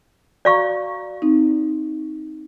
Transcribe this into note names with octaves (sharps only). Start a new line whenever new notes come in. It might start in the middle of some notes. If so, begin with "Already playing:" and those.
F#4 D5 F5 A#5 C#6
C4 D#4